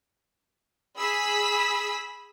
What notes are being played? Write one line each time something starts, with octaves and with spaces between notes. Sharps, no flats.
G#4 B5 E6 B6